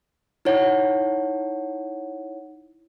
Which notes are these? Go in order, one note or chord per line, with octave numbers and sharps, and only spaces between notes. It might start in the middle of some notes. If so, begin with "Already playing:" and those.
D#4 E4 C#5 F#5